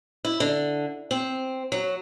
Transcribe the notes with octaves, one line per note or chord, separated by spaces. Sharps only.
E4
D3
C4
F#3